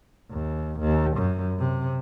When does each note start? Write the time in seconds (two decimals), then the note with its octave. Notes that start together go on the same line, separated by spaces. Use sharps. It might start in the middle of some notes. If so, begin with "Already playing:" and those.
0.31 D#2
0.79 D#2
1.17 F#2
1.59 C3